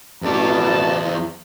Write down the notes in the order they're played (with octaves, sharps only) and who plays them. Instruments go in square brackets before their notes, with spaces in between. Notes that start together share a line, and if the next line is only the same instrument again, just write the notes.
[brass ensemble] A1 B2 A5 [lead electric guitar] E2 D5